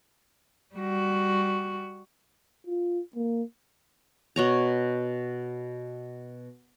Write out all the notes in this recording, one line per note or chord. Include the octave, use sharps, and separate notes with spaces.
G3 F#4
F4
A#3
B2 C#5 A#5